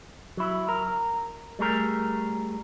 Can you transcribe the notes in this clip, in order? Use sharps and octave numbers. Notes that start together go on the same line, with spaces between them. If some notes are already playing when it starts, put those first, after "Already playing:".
F#3 E4
A#4
G3 A3 G#4 A#4